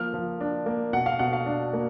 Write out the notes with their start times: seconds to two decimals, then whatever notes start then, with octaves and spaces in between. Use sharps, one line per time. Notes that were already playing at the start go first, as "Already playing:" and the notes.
Already playing: F3 A#3 F6
0.14 F3
0.41 D4
0.66 A#3
0.93 B2 F#5
1.06 F5
1.19 B2 F#5
1.33 F5
1.46 D4
1.73 A#3